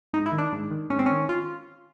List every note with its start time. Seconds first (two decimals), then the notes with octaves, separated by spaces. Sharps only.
0.13 G#2 D#4
0.26 E4
0.32 D#3
0.38 D4
0.52 G#2
0.71 D#3
0.90 G#2 C#4
0.99 C4
1.06 D#3 C#4
1.29 F4